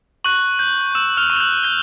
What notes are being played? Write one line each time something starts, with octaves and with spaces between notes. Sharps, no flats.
C#6 F#6 F#7
G6
E6 E7
F6 F7
C#6
F7
F#6 F#7
G6 G7